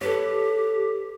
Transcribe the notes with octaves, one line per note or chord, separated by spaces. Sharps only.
G4 A4 B4 C#5